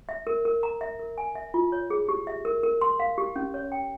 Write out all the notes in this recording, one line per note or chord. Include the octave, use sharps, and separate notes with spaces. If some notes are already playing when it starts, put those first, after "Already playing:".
E5
A#4
A#4
A#5
E5
A#4
G#5
E5
F4
C#5
G#4
G4
E5
A#4
A#4
C6
F5
G4
C#4
C#5
G5